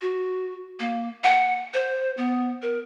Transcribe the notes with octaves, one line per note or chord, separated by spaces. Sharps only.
F#4
A#3
F#5
C5
B3
A#4